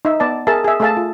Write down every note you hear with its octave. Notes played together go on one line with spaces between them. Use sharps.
D#4 E5
B3 D5 A5
G#4 A#4 E5 A5
G#4 E5
A3 G#4 A4 E5 F5 A5
F4